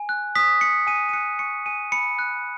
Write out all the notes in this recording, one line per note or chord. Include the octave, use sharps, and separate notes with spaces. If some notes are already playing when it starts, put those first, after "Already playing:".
Already playing: G#5
F#6
D#6 B6
G#5 C#7
G#5 D#7
D#7
F#6 C#7
C#6 C#7
G#5 D#7
B5 C#7
F#6